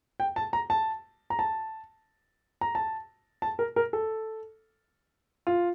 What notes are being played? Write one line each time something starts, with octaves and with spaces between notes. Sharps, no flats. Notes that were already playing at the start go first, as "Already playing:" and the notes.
G5
A5
A#5
A5
A#5
A5
A#5
A5
A5
A#4
A#4
A4
F4